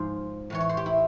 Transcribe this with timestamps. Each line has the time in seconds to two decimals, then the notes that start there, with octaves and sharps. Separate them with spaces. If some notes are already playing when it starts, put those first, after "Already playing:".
Already playing: G#2 F3 C5
0.50 A2 E3 C#5
0.60 C#5
0.69 C5
0.77 G4
0.86 E4